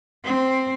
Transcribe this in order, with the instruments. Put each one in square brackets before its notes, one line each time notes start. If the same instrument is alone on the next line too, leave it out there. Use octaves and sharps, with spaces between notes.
[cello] C4